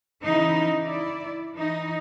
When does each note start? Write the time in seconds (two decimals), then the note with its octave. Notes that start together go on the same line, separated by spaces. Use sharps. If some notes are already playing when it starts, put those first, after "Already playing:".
0.23 C#3 E3 D#4 E4
0.84 E4 D5
1.53 E3 D#4